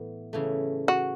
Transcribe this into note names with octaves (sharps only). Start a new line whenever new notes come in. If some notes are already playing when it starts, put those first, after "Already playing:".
Already playing: A2 E3 B3
C#3 E3 A3
F#4